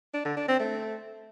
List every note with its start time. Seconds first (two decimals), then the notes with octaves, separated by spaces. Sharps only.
0.14 D4
0.25 D3
0.37 D4
0.48 C4
0.59 A3